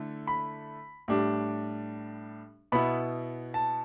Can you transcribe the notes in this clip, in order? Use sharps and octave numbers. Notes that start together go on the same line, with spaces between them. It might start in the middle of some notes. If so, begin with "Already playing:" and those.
Already playing: D3 A3 E4
B5
A2 G3 D4
B2 B3 E4 B5
A5